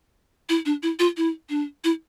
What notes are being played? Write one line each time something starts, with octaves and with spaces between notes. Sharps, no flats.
E4
D4
E4
F4
E4
D4
E4